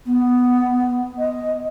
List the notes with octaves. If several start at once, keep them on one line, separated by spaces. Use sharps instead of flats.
B3
D#5